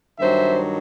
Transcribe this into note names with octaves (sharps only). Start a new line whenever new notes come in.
G2 D#3 F#3 C5 E5